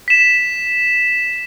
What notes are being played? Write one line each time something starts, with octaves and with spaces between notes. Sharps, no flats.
B6 E7